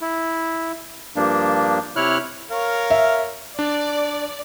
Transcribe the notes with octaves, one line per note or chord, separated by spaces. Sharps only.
E4
G2 F3 A#3 D4
C3 E4 C#5 F6 F#6
A#4 C#5 F5
E5
D4 D5